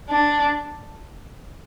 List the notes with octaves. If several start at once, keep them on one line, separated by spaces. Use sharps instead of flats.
D4